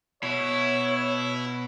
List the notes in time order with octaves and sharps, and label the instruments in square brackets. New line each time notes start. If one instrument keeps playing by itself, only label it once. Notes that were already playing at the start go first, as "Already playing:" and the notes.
[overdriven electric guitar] B2 [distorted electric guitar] E4 [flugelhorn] C#5